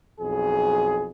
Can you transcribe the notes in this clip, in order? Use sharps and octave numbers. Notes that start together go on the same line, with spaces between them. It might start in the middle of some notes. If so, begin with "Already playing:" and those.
B1 F2 G#4